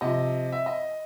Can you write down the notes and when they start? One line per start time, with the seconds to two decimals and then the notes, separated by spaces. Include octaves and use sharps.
0.01 C3 F3 D#5
0.52 E5
0.66 D#5